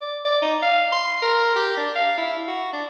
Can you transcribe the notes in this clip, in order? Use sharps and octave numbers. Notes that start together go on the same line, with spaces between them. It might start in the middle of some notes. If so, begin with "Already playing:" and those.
D5
D5
D#4
F5
C6
A#4
G4
D4
F5
E4
F#4
D4